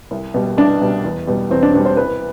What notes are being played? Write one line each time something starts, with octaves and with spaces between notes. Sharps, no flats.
C2
B2 G3
C2 D4
B2 G3
E2
B2 G3
E2 C4
D4
B2 G3 D4
C5
C2 B4